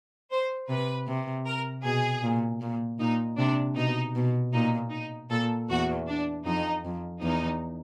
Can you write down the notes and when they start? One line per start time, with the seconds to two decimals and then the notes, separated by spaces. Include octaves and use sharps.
0.31 C5
0.69 C3 B4
1.07 C3
1.46 A#4
1.84 B2 G#4
2.23 A#2
2.61 A#2
2.99 A#2 D#4
3.38 C3 D4
3.76 B2 D#4
4.15 B2
4.54 A#2 D#4
4.91 D#4
5.30 A#2 A4
5.69 E2 F#4
6.08 D4
6.45 F2 D#4
6.85 F2
7.22 E2 D#4